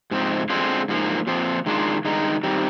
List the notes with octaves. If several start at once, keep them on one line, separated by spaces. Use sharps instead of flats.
G#2 F3 C4
D3 G#3 C4 F4
G#2 F3 A#3
A#2 F3 C4 F4
D#3 G#3 D4 F4
G2 D#3 G#3 D#4
D#3 G3 C4